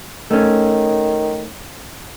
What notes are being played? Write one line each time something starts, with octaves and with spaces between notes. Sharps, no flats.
D#3 A3 C#4